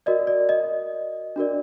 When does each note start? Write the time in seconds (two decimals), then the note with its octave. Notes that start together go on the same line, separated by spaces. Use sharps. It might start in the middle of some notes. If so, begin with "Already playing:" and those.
0.06 F#4 A#4 D5 D#5
0.27 D5
0.49 D#5
1.36 D4 F#4 A#4 D5